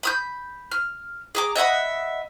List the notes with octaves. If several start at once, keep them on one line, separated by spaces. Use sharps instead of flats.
B5 D#6 G6
F6
G#4 A#5 D6
D#5 E5 F#5 B5